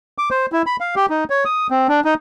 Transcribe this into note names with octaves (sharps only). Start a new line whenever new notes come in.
D6
C5
E4
B5
F5
G4
D#4
C#5
D#6
C4
D4
D#4